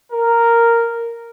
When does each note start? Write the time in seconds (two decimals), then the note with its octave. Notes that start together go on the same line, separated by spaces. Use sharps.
0.12 A#4